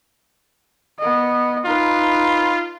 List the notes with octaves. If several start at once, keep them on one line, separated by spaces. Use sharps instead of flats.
B3 D#5
D#4 F4 B4